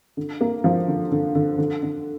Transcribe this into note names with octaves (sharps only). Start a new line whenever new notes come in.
D3
A#3
F3
D3
D3
D3
D3
D3